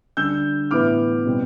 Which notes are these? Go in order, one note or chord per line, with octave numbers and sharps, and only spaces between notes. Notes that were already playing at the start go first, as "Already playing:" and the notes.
D3 G3 D4 E6 G6
A2 E3 B3 D6 F6
B2 G3 C4